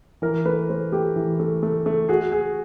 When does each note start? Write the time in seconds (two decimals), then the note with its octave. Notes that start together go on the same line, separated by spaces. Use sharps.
0.22 E3 A#4
0.45 A3 B4
0.69 A3 C5
0.92 A3 G4
1.16 E3
1.40 A3
1.63 A3
1.86 A3
2.09 F#4 G#4
2.32 G#4